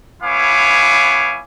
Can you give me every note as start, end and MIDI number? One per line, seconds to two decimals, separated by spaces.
0.23 1.42 59
0.23 1.42 64
0.23 1.42 73
0.23 1.42 77
0.23 1.42 80
0.23 1.42 86